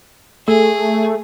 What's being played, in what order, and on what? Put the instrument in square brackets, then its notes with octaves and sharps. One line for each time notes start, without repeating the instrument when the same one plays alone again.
[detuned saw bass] A3 [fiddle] G#4 [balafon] A4